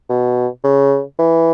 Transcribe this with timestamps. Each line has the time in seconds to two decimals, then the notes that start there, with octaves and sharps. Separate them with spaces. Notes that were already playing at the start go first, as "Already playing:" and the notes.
0.10 B2
0.64 C#3
1.19 E3